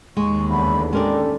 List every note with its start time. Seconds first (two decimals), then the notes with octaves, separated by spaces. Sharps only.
0.17 D#2 G#3 C#6
0.50 E2 D3 B5
0.93 G#3 C#4 D4 G4 A4 A#4 D5